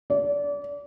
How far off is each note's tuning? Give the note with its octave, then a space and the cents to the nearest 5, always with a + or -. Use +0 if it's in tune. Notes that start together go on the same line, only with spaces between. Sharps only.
D5 -30